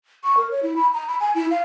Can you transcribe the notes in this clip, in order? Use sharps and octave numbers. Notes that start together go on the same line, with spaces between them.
C#6
A#4
C#5
E4
B5
A#5
B5
G#5
E4
F5